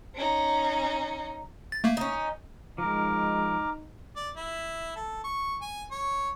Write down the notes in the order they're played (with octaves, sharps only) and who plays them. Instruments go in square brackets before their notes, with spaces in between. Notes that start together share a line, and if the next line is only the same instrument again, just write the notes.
[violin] C#4 D#4
[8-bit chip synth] A6
A3 A#3
[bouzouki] C#4 D#4
[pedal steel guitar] F3 A#4 [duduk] G#3 [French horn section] D#4 [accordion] A#5 D6 F6
[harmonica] D5
E4
A4
C#6
G#5
C#5